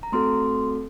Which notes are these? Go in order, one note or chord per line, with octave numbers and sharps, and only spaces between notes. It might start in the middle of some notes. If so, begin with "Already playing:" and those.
A#5
A3 C4 F#4 A4 C6